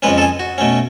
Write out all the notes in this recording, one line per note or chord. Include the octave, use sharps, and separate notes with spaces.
F2 C#3 G#3 C#4 B4
A4
G#4
F#4
B2 A3 C#4